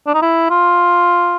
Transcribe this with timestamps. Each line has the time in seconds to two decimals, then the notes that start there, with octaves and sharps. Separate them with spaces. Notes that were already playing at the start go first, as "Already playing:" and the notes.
0.07 D4
0.14 D#4
0.22 E4
0.50 F4